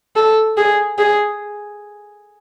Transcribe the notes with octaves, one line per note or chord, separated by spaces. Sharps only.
A4
G#4
G#4